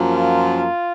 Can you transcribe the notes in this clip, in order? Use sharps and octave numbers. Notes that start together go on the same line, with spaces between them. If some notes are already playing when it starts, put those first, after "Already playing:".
Already playing: F#2 F3 A#3
F4